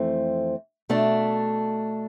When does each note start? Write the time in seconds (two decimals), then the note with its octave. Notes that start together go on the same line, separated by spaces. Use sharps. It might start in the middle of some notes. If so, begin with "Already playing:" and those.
Already playing: F2 E3 A3 C4
0.89 B2 A3 D4